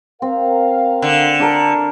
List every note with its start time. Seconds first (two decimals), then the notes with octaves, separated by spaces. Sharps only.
0.22 C4 A#4 F5
1.02 D3
1.40 D4 A4 A#4